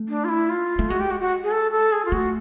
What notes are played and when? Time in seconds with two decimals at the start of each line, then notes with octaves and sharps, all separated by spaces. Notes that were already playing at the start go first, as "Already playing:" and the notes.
Already playing: A3
0.09 D4
0.24 F4
0.29 E4
0.49 F4
0.79 A3
0.89 G#3 F#4
1.00 G4
1.10 F#4
1.21 F#4
1.44 G#4
1.51 A4
1.71 A4
1.92 G#4
2.05 F4
2.12 A3 F#4